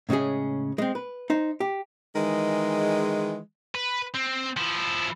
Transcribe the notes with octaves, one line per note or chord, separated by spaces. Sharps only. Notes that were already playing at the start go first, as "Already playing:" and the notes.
A2 C#3 G#3 C#4 G#4
G#3 C4
B4
D#4 C5
G4
D#3 E3 G#3
B4
C4
F3 E4